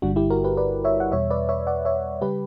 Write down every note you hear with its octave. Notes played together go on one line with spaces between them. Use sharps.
G1 G2 D3 G3 D4 F#4
E4 G4
F#4 A#4
G4 B4
B4 D5
C#5 E5
F#5
E2 B2 G3 C#5 E5
B4 D5
C#5 E5
D5 F#5
C#5 E5
C#3 G3 G4 B4